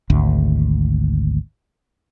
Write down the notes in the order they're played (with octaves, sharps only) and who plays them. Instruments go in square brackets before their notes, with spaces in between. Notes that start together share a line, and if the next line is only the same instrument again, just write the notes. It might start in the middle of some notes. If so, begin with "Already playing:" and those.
[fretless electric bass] G#1 D2